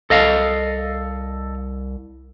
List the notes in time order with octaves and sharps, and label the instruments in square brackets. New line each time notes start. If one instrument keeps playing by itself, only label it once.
[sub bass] C2 [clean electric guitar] A4 D#5 F5